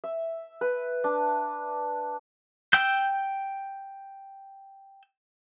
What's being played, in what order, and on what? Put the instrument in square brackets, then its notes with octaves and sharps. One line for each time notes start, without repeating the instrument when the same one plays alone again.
[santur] E5
B4
D4
[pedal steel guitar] G5 E6 G6